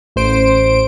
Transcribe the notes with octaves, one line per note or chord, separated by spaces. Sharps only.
A1 C5 D7